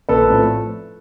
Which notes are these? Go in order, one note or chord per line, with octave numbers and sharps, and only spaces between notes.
A#1 A4 B4
A2 F3 A3 C4